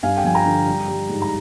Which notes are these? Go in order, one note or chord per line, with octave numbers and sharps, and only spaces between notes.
G2 F5 G#5
G5
F3 G#5
G5 A#5
D3
G3
G3
G#2
A#5